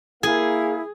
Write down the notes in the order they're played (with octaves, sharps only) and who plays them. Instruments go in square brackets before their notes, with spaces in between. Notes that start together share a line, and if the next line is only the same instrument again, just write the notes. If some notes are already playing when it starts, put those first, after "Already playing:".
[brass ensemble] A#3 F5 [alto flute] E4 [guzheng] G#4